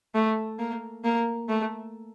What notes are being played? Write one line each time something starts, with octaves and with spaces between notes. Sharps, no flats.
A3
A#3
A#3
A3